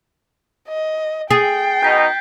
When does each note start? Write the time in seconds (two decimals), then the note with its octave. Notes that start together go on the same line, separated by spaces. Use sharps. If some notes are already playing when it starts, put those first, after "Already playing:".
0.68 D#5
1.31 G#4 G5 A6 C7
1.83 B2 D#4 G6 B6